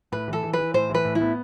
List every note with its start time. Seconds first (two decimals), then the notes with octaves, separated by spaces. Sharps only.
0.12 A2 B4
0.28 E3 A4
0.43 E3
0.53 B4
0.59 E3
0.74 A2 C5
0.90 E3 B4
1.05 A2
1.15 E4
1.21 B3